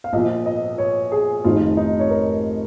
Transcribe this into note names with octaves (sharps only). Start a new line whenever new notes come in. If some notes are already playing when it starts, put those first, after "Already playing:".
F5
A#1 A#2 F3 D#5
D#5
C#5
G#4
F1 F2 D#3 F4
D#4
C#5
A#4